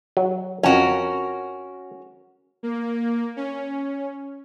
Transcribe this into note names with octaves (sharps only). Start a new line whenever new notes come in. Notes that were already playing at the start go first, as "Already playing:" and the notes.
F#3
F2 C#4 F#4 A#4
A#3
C#4